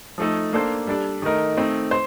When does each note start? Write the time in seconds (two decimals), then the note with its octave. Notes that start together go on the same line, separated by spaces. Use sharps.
0.18 F3 A3 D#4 A4
0.53 A#3 D4 A4 C5
0.87 G3 D4 A4 D5
1.22 D#3 A3 D#4 A#4 D#5
1.57 A3 C4 D#4
1.91 C5